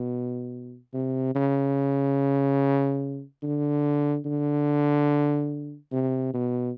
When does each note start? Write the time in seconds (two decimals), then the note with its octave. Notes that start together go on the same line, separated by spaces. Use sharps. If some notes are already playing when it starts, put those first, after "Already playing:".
Already playing: B2
0.93 C3
1.35 C#3
3.43 D3
4.25 D3
5.92 C3
6.34 B2